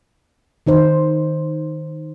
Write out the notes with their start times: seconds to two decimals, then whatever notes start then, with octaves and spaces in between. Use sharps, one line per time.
0.66 D#3 D#4 C5